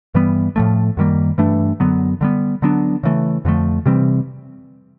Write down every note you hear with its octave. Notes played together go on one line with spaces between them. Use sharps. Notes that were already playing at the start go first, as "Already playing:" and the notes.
G2 E3 G3 B3
A2 F3 A3
F#2 D#3 G3 A#3
G2 E3 A3 D4
F#2 D3 F#3 B3
D3 G3 B3
D3 F#3 B3 D4
C#3 E3 A3
F2 D3 F3 A3
C3 E3 G3 C4